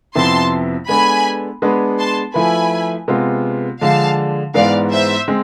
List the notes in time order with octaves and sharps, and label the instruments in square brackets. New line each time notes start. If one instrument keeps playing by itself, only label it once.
[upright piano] F2 C3 F3 B3 E4 [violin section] A5 C6
[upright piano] G#3 B3 D4 A4 [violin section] G#5 B5
[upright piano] G#3 B3 D4 G#4 B4
[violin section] A5 C6
[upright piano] F3 A3 E4 B4 [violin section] G#5 B5
[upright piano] C3 G#3 B3 F4
[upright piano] D3 F3 G#3 D4 G#4 [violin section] F5 A5
[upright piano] G#2 E3 G#3 B3 [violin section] D5 F5
[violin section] C5 E5
[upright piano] G#3 C4